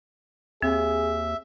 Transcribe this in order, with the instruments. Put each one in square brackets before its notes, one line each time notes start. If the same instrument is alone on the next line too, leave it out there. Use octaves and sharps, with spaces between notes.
[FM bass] D#2 [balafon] C4 [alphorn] G#4 [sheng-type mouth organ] E5